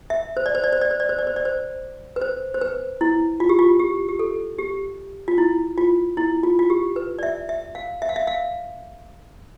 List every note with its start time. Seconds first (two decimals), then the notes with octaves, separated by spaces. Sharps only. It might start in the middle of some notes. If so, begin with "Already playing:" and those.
0.10 E5
0.37 C5
0.46 D5
0.55 C5
0.64 D5
0.73 C5
0.81 D5
0.91 C5
1.00 D5
1.09 C5
1.18 D5
1.27 C5
1.36 D5
1.45 C5
2.16 B4
2.21 C5
2.54 C5
2.61 B4
3.01 E4
3.40 F4
3.49 G4
3.59 F4
3.80 G4
4.08 G4
4.19 A4
4.59 G4
5.28 F4
5.38 E4
5.78 F4
6.17 E4
6.43 F4
6.59 F4
6.70 G4
6.96 B4
7.19 D5
7.23 E5
7.49 E5
7.75 F5
8.02 E5
8.09 F5
8.16 E5
8.27 F5